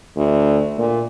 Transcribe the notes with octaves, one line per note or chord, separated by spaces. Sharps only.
D2
A#2